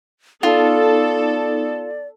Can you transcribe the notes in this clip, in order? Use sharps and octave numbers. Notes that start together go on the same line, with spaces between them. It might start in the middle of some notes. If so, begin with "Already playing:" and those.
B3 D#4 F4 A4 D5